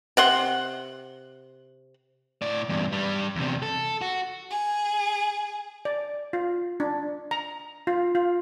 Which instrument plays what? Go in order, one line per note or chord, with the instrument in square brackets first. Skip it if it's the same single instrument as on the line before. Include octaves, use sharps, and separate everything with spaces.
[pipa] C3 F#5 C6
[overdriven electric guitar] A2 D5
E2 G2
G2 G3
E2 C3
A4
F#4
[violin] G#4
[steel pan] D5
F4
D4
A#5
F4
F4